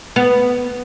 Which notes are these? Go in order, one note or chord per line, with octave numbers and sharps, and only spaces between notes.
B3